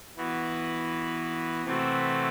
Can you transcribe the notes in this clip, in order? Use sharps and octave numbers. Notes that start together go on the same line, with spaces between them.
E3 B3 F#4
C3 E3 A3 C4 F#4